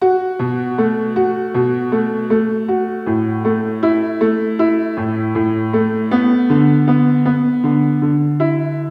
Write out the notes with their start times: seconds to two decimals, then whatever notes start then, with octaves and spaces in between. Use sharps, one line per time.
0.02 F#4
0.39 B2
0.78 A3
1.16 F#4
1.54 B2
1.92 A3
2.30 A3
2.68 F#4
3.06 A2
3.45 A3
3.83 E4
4.21 A3
4.59 E4
4.97 A2
5.35 A2
5.73 A3
6.11 B3
6.50 D3
6.88 B3
7.25 B3
7.64 D3
8.02 D3
8.40 E4